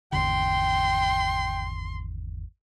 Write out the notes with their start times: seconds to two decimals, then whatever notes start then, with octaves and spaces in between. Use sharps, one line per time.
0.12 G#1 E2 D3 G5 C6